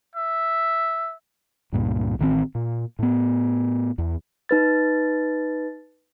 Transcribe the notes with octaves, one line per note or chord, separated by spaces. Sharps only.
E5
C#2 G2 A#2
A1 D#3 F3 C4
A#2
A2 B3
E2
D#4 B4 A6